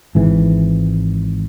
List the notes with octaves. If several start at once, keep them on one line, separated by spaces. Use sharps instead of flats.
G#1 G#2 E3